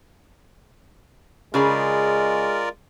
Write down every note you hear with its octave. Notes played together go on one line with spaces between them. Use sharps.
C#3 G#3 F4 G#4 A#4 D5 G#5